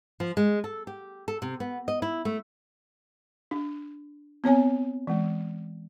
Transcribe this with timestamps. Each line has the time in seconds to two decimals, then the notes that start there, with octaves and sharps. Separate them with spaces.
0.20 F3
0.37 G#3
0.64 A4
0.87 G4
1.28 A4
1.42 C3
1.60 B3
1.88 D#5
2.02 E4
2.25 A3
3.51 D4
4.44 B3 C4 C#5 G#5
5.07 E3 G#3